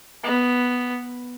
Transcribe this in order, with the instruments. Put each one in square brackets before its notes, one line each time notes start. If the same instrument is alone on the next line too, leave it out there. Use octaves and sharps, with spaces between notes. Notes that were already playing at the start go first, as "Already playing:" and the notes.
[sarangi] B3